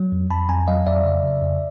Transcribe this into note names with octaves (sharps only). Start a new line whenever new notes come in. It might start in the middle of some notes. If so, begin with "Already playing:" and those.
Already playing: F#3
F2
F2 A5 B5
F2 G#5 A#5
F#3 D#5 F5
F2 D5 E5
C#3
C#3
F2